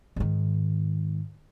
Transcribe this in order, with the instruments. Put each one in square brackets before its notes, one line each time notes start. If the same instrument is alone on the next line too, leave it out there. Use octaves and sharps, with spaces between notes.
[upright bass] G#2 D#3